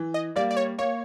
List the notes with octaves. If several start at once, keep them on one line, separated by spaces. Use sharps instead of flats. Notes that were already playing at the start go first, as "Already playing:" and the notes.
Already playing: E3
D#5
G3 A#3 D5
D5
C#5
A#3 C#5